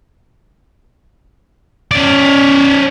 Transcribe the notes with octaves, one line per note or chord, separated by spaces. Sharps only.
C#4 D5